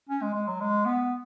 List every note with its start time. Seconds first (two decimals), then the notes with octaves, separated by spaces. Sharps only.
0.09 C#4
0.22 G#3
0.35 G#3
0.47 F#3
0.61 G#3
0.86 B3